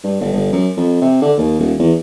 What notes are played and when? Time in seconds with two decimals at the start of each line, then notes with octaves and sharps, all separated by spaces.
0.04 G2
0.21 G1
0.33 G1
0.53 F#2
0.77 F2
1.02 C3
1.22 D3
1.38 D#2
1.60 D#1
1.79 E2